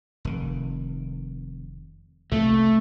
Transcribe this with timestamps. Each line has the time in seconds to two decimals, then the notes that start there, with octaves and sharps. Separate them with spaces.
0.25 F1 D#3
2.32 B1 C3 A3 A#3